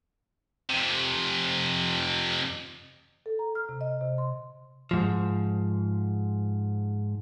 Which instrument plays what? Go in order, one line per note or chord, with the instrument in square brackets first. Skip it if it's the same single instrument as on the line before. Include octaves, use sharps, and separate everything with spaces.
[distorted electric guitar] F2 C3
[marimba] A4
A#5
F6
C3
D#5
C3
C6
[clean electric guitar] G#2 F3